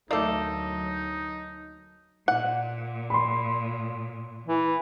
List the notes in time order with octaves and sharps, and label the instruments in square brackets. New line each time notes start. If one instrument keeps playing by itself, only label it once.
[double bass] D2 F#3 [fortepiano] A3 D5 [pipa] A#3 A4 [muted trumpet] D#4
[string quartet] A#2 [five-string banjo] F#5
[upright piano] B5 C6
[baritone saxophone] E3